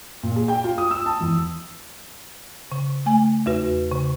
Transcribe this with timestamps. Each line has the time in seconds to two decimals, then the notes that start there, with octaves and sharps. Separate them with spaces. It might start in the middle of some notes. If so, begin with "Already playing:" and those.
0.23 A#2
0.36 G#4
0.48 G5
0.64 F4
0.78 D#6
0.91 E6
1.06 A5
1.21 E2
2.72 C#3
3.06 A3 G#5
3.46 E2 F#4 B4
3.91 C#3